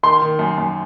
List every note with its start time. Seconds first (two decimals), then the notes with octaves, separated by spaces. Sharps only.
0.03 D#3 C6
0.22 D#3
0.39 F#2
0.58 F#2